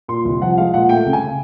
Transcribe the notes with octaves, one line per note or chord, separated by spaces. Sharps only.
A#2 C6
C2
F3 F#5
G#3 F5
A#2 F#5
A3 G5
C#3
G#5